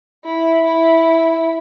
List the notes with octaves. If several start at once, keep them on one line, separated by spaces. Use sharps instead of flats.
E4
E4